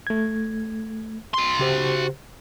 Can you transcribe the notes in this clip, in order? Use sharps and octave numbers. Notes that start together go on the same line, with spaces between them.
A3 G#6
F#4 C6
C#3 G4 C5